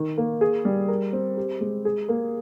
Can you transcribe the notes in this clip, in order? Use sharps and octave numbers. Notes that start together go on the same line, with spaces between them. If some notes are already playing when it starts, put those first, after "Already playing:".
Already playing: D#3
A#3
G#4
G3
A#4
C4
G4
G#3
G#4
A#3